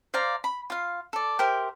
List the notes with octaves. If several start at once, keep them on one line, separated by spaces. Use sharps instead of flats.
C5 D5 F5 A#5
B5
F4 F5
A4 D5
G4 A#4 C5 E5